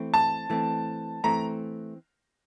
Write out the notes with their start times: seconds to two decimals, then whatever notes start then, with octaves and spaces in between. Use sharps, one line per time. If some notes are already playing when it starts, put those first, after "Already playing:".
Already playing: E3 A3 C4
0.14 A5
0.50 E3 A3 C4
1.24 E3 A3 C4 A#5